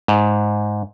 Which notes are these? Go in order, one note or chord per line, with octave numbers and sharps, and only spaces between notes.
G#2